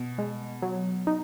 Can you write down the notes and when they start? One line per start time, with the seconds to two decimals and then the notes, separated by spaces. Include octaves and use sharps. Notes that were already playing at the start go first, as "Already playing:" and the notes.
Already playing: B2
0.18 G#3
0.62 F#3
1.07 D#4